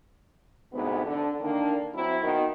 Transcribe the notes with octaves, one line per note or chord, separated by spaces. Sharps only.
D2 G#2 C3 B3
D3
D3 D#3 A#3 D4
F#3 C4 E4
B2 D#3